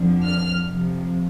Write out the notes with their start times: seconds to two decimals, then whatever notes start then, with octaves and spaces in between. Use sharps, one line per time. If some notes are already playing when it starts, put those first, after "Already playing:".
Already playing: F2 D3 F3
0.23 F6
0.65 F2 C3 F3